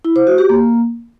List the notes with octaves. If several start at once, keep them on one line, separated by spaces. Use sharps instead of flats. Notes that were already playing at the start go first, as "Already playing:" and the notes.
E4
C5
F#4
G4
A#3